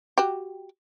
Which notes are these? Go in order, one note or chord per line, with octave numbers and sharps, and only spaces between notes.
F#4 G4